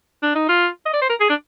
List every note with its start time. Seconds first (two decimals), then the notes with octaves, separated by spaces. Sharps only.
0.23 D4
0.35 D#4
0.49 F4
0.85 D#5
0.93 D5
1.02 C5
1.09 A#4
1.20 G#4
1.29 D4